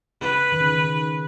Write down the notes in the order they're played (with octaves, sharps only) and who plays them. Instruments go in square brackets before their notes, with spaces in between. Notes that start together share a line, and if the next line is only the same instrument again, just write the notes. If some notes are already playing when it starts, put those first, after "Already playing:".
[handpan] C#3 [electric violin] B4
[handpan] D#3
C#3
D#3
C#3